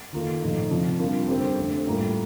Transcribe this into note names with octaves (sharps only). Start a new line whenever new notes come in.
D#3 A#3 F4 A4
A#2 F3 A3 D#4
C3 F3 C4
C3 G3 D4 F4 A#4
D3 G3 C4 G4 A#4
F2 D3 A3 C4
A2 G3 A#3 F4 A#4